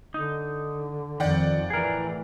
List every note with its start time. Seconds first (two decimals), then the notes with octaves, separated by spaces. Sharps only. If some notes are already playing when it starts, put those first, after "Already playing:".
0.14 D3 D#4
1.20 F2 D#3 D5 F#5 G5
1.70 A2 E3 G#4 A#4